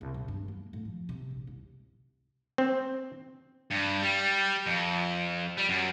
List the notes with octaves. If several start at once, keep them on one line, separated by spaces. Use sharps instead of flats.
C2
A#2
G2
A#3
A2
F3
C3
A#1
C2
C4
G2
G3
F2
G3
F#2